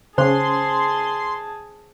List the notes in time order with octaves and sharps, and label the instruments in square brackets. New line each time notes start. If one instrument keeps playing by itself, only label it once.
[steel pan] C#3 C#4 [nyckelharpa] G#4 A5 [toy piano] C5 [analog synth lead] C6